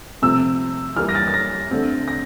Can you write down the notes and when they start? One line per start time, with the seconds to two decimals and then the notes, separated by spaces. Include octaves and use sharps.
0.22 C3 F3 A3 C4 E6
0.97 E3 G3 A#3 F6
1.09 A#6
1.15 A6
1.28 A6
1.34 A#6
1.71 D3 A3 C4
2.08 A#6